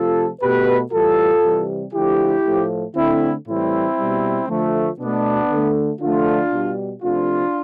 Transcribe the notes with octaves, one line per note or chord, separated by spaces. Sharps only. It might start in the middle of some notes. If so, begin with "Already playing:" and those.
Already playing: C3 F3 A3 F4 A4
B2 A3 G4 B4
A2 E3 G3 F4 A4
C3 E3 G3
D3 F3 A3 E4 G4
A2 F3 A3
D3 A3 C4 E4
A2 E3 G3 C4 E4
B2 G3
D3 F3 A3
B2 A3 B3 D4
D3 A3
D3 F3 A3 D4 F4
B2 G3
C3 F3 A3 D4 F4